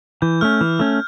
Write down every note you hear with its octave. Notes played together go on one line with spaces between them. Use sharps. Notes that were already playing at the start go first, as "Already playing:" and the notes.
E3 G6
A3 C#4 F6
E3
A3 C#4